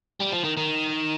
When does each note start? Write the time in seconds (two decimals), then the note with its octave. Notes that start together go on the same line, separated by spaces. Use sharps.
0.21 G3
0.33 F3
0.45 D#3
0.58 D#3